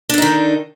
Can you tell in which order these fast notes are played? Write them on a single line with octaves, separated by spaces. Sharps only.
D4 D3 D#4 D#3